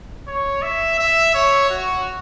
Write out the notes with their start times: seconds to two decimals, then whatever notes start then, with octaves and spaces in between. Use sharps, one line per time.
0.27 C#5
0.62 E5
0.99 E5
1.34 C#5
1.70 F#4